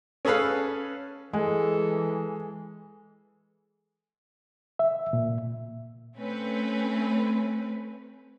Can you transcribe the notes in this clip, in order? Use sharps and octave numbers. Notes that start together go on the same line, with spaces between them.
C#4 G#4 A4 B4 F5
E3 G#3 G#4 A4
E5
A#2
A3 C4 C#4 B4